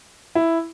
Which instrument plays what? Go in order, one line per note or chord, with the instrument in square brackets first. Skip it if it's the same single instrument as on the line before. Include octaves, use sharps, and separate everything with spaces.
[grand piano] E4